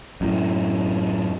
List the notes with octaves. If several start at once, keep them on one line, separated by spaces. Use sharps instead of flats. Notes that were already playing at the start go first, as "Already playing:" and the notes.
F#2 A2